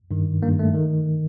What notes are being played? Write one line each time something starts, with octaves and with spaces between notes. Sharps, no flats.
G2 D#3
G2 D#3 A#3
A3
D#3